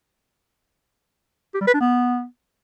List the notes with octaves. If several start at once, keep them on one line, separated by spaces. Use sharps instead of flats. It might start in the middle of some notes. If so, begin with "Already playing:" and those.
G4
G3
B4
D4
B3